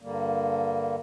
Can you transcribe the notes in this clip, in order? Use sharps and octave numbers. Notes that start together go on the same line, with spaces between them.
G2 D3 G3 A#3